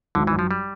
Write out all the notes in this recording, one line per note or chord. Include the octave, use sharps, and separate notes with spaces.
G#1 D3
E3
F#2
F3
G3